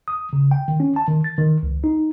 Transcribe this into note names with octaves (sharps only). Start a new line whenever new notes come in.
D#6
C#3
G5
D#3
C#4
A5
D#3
A6
D#3
C#2
D#4